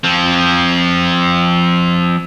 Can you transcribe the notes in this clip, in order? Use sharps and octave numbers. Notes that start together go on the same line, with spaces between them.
F3 C4